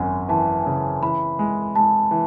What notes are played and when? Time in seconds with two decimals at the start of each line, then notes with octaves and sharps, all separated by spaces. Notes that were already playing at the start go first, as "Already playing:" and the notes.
Already playing: G#1 F#2 F#5 G#5
0.29 E3 A5
0.66 C#3
1.02 E3 B5
1.39 G#3
1.76 G#3 A5
2.11 E3